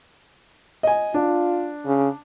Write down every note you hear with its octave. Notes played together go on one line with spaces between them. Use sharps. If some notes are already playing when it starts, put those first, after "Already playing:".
D#5 G#5
D4 F4
C#3